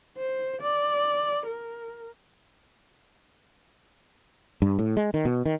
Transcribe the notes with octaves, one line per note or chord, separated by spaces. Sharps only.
C5
D5
A#4
G2
A2
G#3
D#3
B2
D#3